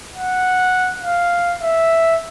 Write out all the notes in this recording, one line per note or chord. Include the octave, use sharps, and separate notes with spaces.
F#5
F5
E5